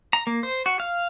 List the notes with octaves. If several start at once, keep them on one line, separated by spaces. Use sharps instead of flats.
A#5
A#3
C5
F#4
F5